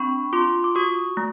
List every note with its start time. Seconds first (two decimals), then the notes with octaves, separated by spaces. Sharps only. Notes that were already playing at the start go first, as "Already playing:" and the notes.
Already playing: C4 D4 B5 C#6
0.33 F4 C6 D6
0.64 D6
0.75 F#4 C#6 D#6
1.17 A3